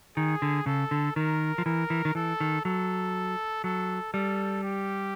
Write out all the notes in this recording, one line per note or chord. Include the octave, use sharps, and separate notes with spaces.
D#3 G#4
D3
C#3 A4
D3
D#3 A#4
F3
E3 A#4
E3
D#3
E3 A4
D#3
F#3 A4
F#3 A4
G3 A4
G4